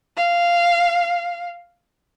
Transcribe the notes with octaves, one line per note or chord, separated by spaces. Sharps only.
F5